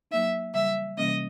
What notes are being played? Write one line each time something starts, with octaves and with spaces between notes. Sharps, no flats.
F#3 A#3 D#4 E5
C#3 E3 G3 E5
C3 E3 G3 A#3 C#4 D#5